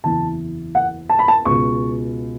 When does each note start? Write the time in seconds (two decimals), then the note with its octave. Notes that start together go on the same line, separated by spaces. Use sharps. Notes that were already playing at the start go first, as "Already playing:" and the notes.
0.04 F#1 E2 E3 A5
0.75 F#5
1.09 A5
1.19 B5
1.28 A5
1.45 C#2 B2 C#6